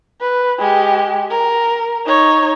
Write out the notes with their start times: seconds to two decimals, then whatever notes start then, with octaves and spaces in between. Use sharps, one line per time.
0.21 B4
0.59 G#3 G4
1.30 A#4
2.06 D#4 C#5